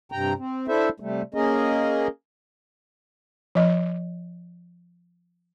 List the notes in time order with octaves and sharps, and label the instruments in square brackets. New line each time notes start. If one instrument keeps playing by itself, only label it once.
[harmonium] G2 C3 G5 A#5
C4
D4 E4 A4 C5 E5
C3 G3 A3
A#3 C#4 G#4 A#4 D#5
[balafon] F3 D#5